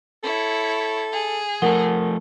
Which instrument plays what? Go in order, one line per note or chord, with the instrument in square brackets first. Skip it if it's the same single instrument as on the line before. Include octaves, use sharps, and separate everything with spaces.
[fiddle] E4 C#5 [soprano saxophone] A4
[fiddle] G#4
[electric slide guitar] F3 A3 A4 [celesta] A#4 F#5 G7